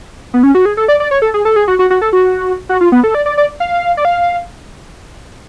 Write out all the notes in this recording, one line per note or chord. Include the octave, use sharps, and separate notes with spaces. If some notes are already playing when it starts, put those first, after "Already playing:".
B3
C#4
F#4
G#4
A4
D5
D5
C#5
A4
G#4
A4
G#4
F#4
F#4
F#4
A4
F#4
F#4
F4
B3
A4
D5
D5
D5
F5
D5
F5